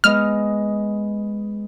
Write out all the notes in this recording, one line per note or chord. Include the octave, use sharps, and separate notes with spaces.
G#3 B3 D#5 F6